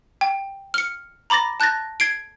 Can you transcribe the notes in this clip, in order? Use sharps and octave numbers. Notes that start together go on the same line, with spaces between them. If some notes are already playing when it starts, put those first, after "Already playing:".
G5
F6 C#7
A#5 B5 D6 A6 A#6
A5 F#6 G6 A6 A#6
G#6 C7 D7